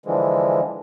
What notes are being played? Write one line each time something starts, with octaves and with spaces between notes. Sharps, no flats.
D3 E3 F3 G#3